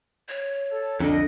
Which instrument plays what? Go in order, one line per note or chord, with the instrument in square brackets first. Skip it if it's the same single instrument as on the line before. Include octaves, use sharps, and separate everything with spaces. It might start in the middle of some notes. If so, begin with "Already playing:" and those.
[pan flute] C#5
[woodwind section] A4
[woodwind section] C2 D#5 [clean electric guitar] F2 D3 [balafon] D4 [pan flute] A4